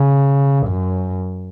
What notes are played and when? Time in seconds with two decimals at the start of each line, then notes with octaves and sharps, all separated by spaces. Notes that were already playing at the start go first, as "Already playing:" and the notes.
Already playing: C#3
0.68 F#2